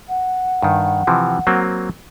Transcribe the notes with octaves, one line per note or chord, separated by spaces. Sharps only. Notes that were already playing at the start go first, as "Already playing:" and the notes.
F#5
G2 D#3
C3 E3 F3
F#3 A#3 C4